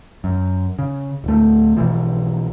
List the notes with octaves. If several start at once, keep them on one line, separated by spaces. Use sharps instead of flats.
F#2
C#3
D1 A3
B1 B2 E3 F3